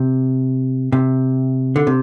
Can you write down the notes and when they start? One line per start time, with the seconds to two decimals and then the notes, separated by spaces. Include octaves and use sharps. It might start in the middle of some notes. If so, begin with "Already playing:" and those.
Already playing: C3
0.92 C3
1.76 D3
1.87 C3